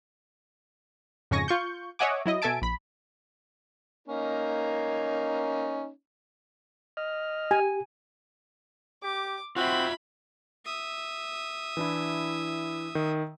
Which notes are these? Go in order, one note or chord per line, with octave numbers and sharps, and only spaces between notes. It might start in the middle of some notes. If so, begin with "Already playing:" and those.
F2 G#2 C#3 G#5 C#6 A#6
F4 C#6 G6
C#5 D#5 E5 F#5 G#5 D6
F#3 E4 D#5
B2 A4 E5 G#5 A5 D7
A#1 B5
A#3 C#4 D#4
D#5 F6
G4 G#5
G4 D6
C4 F4 F#4 E5 B5
E5 D#6
E3 D4 E4
D#3